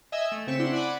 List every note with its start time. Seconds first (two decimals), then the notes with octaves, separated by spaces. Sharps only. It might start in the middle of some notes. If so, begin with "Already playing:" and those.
0.12 D#5 E5 G#5 E6
0.32 A3
0.47 C#3 C4 C#6 B6 E7
0.59 D4 E4 F#5 C6
0.73 D5 F#5 G#5 B5 D6